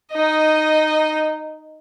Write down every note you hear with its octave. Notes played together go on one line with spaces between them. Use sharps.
D#4 D#5